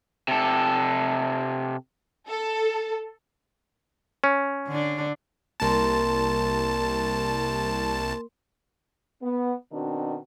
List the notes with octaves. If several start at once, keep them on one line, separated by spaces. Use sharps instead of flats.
C3 A4
A4
C#4
D3 D4
C2 A#3 A#4 A5 C6
B3
B2 D#3 C4 D4 F#4